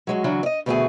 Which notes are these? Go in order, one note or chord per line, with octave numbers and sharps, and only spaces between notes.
F#3 G#3 F#4
C#3 E3 F#3 D4 F#4
D5 D#5
D2 B2 E3 A3 F#4 G#4